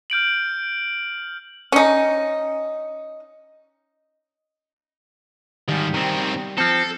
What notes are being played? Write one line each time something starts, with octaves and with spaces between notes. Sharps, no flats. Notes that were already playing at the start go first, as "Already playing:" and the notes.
F6 G6 D7 F#7
C#4 D#4
G#2 D#3 G3
D#3 C4
F3 C4 A4